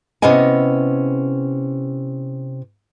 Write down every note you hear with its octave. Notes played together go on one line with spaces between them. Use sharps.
C3 B3 C#4 E4 D#5 G#5